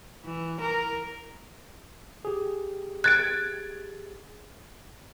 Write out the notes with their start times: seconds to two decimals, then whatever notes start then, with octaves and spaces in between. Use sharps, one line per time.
0.25 E3
0.61 A#4
2.25 G4 G#4
3.04 F#6 G#6 A6 D7